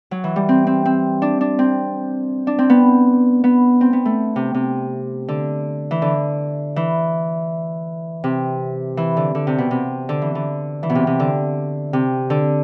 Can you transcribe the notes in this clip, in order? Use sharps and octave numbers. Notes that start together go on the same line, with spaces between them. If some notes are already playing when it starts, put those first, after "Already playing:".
F#3
E3
G3
C4
C4
C4
D4
D4
C4
D4
C4
B3
B3
C4
B3
A3
C3
C3
D3
E3
D3
E3
C3
E3
D3
D3
C3
B2
C3
D3
E3
D3
E3
B2
C3
C3
D3
C3
D3